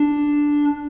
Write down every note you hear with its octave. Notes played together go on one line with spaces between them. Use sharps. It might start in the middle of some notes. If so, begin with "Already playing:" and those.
Already playing: D4